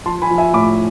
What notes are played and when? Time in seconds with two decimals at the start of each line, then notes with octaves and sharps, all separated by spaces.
0.06 F3 A5 C6
0.22 G#5 B5
0.30 F3
0.38 E5 G#5
0.54 A2 B5 D6